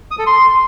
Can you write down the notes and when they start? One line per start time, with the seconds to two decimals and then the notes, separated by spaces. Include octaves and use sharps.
0.11 D#6
0.19 A4
0.26 C6